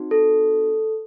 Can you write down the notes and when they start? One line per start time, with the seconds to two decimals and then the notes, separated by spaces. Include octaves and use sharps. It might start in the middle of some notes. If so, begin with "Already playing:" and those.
Already playing: C4 D#4 F#4
0.11 A4